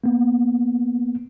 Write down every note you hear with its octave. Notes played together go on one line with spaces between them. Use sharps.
A#3 B3